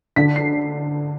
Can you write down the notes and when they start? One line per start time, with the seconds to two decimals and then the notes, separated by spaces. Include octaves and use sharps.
0.16 D3 B6
0.36 C7